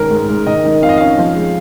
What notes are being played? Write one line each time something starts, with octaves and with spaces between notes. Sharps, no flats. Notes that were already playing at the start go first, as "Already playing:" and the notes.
Already playing: G#2 D#3 C#4 A#4
G#2
G#2
D#3 D#5
D#3
F2 F5
D#5
C#4 F5
F3
G#3